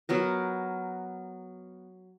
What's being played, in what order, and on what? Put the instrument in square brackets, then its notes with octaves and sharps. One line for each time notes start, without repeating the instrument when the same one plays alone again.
[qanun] F#3 B3 A#4